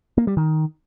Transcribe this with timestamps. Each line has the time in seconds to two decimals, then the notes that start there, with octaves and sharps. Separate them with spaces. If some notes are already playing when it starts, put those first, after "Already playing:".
0.18 A#3
0.27 G3
0.37 D#3